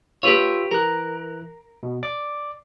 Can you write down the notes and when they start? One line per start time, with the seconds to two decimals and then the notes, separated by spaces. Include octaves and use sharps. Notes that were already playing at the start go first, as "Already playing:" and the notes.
0.23 F4 G4 B4 C#5 E6
0.71 E3 A#4 F#6
1.83 B2
2.03 D5 D6